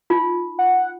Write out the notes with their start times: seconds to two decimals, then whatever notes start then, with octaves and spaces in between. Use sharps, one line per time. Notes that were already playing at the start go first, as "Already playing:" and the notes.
0.10 D#4 F4
0.59 F#5